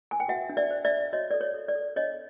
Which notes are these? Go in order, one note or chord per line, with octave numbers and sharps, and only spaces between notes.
G#5
G5
F#4 E5 F#5
D4
D5 E5
C5
D5 E5
C5
F#4 C#5 D#5
A4 D5
C#5
A4
D5
A4
D4 C#5 D#5